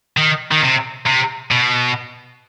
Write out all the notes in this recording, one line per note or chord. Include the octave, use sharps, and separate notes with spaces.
D#3
D#3
C3
C3
B2